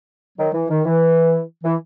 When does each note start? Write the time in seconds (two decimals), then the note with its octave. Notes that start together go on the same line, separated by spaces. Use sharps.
0.38 D#3 F#3
0.54 E3
0.69 D#3
0.85 E3
1.64 E3